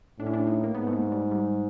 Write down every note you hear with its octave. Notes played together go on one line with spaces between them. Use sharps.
A2 D4
C#4
D4
D#4
A#3
G#2 B3
A3
A#3
G3
G3